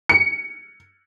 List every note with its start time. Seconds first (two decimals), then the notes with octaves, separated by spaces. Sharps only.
0.09 C#7